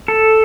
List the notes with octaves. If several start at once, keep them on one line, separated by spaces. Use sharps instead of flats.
A4